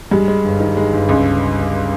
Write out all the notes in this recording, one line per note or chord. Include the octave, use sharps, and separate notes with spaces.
G2 G3 G#3
G#3
G1
D#3
G#3
G1
C#2